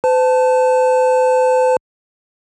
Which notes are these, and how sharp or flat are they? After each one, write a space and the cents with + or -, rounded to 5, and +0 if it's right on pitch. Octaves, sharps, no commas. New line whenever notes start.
C5 -45 A5 +0